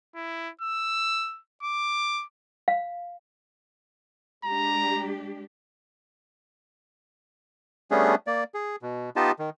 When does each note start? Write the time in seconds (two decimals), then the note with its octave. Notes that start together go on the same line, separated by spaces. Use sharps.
0.15 E4
0.61 E6
1.63 D6
2.68 F5
4.45 G#3 D4 G4 A#5
7.91 G3 A3 B3 C#4 D4 G#4
8.27 A#3 D5
8.54 G#4
8.82 B2
9.16 B3 D#4 F4 G4 D#5 A5
9.39 D#3